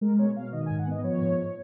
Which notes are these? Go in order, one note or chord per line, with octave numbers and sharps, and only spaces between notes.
G#3 A#4
B2 C#5
B2 F5
D#3 D#5
G#5
G#2
F#5
B3 D#5
F3 C#5
G#2